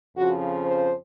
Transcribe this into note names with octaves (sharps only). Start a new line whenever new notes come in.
F2 C#3 F3 F#4
C5